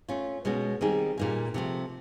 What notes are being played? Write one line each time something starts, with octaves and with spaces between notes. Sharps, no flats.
A3 C#4 F4
B2 G#3 C#4 F#4
D#3 G3 C4 D#4 G#4
A#2 G3 A#3 D#4 G#4
C3 F3 A3